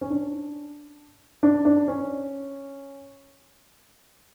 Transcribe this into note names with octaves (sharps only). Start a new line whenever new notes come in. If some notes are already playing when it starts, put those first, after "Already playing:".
C#4
D4
D4
D4
C#4